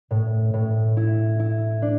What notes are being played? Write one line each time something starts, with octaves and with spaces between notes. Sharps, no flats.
A2
A2
E4
E4
D4